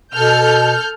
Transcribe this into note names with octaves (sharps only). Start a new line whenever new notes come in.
B2 A4 F6 G6